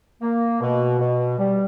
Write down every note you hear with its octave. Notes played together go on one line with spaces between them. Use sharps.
A#3
B2
B2
G3